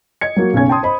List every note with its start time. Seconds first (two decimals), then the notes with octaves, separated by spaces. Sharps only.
0.21 D#5 G#6 C#7
0.36 F#3 A#3 F#4
0.53 F#1 B1 B2 C#4 G#6
0.69 G5 A5 C6 D#6
0.83 C5 D#5 B5